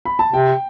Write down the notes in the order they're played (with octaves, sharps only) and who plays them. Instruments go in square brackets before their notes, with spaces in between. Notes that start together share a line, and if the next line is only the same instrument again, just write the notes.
[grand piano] B5
A5
[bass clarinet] C3 [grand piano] G5